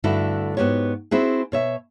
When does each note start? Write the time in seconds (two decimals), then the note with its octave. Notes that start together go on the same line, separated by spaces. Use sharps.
0.04 G2 D3 A3 D4 E4 F#4
0.57 G#2 B3 F#4 G4 C#5
1.11 C4 E4 F#4 G#4
1.52 B2 C#5 E5